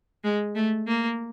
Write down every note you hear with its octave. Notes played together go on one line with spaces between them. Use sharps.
G#3
A3
A#3